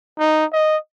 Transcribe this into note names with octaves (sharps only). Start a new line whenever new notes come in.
D#4
D#5